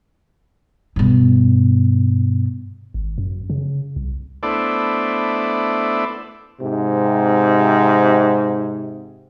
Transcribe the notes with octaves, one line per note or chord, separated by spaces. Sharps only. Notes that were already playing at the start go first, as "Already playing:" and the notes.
G2 B2
G#1
F#2
C#3
C2
A3 B3 D4 E4 C5 D5
G#2 C3